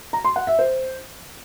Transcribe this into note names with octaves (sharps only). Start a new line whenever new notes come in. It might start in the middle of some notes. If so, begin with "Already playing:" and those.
A#5
C6
F#5
E5
C5